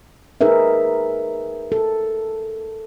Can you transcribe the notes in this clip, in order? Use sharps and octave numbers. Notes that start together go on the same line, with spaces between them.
D#4 G#4 A#4 B4 E5
A4